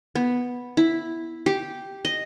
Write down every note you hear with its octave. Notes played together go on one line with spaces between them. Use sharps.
B3
E4
G4
D#5